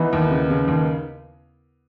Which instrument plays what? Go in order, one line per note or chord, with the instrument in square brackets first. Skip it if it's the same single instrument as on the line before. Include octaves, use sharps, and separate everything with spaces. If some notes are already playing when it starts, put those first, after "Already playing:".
Already playing: [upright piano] E3 [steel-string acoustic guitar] B3 D#4
[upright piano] D#2
C#3
C#3
D#2